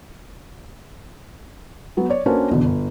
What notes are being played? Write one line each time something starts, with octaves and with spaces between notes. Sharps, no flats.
F#3 B3
C#5 D5
A#3 C#4 D4 F#4 B4 C5
B1 E2 B2 D3
G1